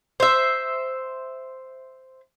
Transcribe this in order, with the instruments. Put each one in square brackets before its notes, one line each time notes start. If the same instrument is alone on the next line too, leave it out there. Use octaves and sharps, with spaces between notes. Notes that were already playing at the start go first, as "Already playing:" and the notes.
[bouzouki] C5 E5